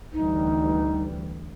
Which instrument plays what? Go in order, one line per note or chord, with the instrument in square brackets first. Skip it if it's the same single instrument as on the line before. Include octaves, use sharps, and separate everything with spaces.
[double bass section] D2 E3 G3 [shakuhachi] D#4